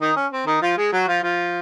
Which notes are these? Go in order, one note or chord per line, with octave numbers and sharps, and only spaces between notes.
D#3 D#4
C#4
C4
D#3 D#4
F3 F4
G#3 G#4
F#3 F#4
F3 F4
F3 F4